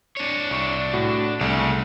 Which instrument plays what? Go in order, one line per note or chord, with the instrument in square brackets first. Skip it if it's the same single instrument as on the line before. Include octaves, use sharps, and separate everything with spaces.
[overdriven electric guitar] D4 C#5
[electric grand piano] C2 C#6
A2 F#4
[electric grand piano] C2 A3 [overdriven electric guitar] C#3